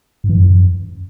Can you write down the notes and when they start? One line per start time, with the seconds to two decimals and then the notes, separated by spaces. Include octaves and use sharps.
0.24 G#2
0.29 E3
0.35 F#2